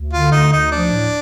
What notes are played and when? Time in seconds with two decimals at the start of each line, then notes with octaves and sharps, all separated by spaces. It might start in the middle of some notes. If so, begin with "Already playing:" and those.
Already playing: D2
0.12 D3 F4
0.32 D2 D#4
0.52 D2 D#4
0.71 F3 D4
0.91 A2